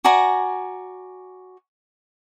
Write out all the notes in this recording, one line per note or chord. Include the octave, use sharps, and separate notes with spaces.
F#4 D5 G#5 A#5